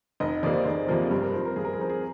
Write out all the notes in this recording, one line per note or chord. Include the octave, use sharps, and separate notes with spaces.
F1 D#5
F2 C3 F3 A#3 D5
C5
F1 G#4
F2 C3 F3 A#3
G2 G4
A#4
F3 C4 C5
A#4
G2 G#4
A#4
G#4
F3 C4 A#4
G#4